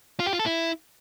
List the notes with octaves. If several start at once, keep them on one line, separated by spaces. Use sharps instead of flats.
F4
G4
F4
A4
E4